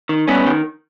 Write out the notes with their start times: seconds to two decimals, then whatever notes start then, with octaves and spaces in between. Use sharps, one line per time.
0.09 D#3
0.28 G2 B3 C#4
0.46 D#3